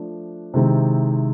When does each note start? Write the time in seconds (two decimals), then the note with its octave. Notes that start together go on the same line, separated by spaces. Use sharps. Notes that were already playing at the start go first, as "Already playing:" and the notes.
Already playing: F3 A3 D4
0.54 C3 D#3 G#3 C4 E4